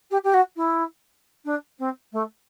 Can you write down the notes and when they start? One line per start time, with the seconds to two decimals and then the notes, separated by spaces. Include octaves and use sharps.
0.10 G4
0.23 G4
0.33 F#4
0.56 E4
1.44 D4
1.78 C4
2.12 A3